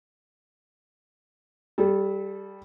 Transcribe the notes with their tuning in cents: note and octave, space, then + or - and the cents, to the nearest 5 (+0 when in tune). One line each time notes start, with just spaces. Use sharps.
G3 +0 A4 -35